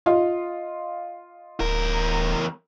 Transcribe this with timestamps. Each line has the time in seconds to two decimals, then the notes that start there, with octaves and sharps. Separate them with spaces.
0.06 F4 D#5 F5
1.60 D1 E2 A#4